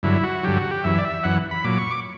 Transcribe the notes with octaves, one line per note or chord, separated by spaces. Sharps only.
G2 D3 F#3 E4
F#4
G2 D3 F#3 G4
F#4
G4
F#2 E3 E5
D5
E5
F#2 E3 F#5
B5
A#2 F#3 D6
C#6
D6